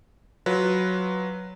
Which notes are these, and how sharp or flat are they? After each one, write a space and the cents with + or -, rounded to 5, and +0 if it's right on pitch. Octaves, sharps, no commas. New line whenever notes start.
F#3 +0 F4 +0 B4 +0